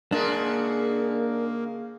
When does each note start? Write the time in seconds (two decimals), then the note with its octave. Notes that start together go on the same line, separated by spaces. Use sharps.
0.12 C#3 G#3 A#3 D4 F#4 A#4